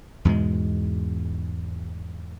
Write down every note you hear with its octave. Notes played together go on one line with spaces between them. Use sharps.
E2 G#2 B2 G#3